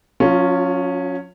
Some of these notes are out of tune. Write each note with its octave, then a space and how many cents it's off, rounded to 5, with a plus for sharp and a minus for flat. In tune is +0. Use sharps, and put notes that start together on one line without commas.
F#3 -45 C#4 +0 F4 +0